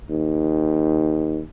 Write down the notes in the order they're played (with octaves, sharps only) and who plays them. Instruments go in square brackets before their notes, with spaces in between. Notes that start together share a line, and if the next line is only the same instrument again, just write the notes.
[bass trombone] D#2